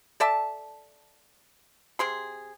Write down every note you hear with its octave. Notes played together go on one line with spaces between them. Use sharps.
A4 D5 E5 A5
C3 G#4 C6